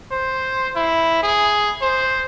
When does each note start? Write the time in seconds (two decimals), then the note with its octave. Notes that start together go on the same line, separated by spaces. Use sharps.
0.11 C5
0.76 E4
1.23 G#4
1.82 C5